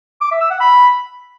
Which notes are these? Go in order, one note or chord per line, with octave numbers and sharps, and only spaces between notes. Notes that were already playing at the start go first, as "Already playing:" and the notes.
D6
E5
E6
F#5
B5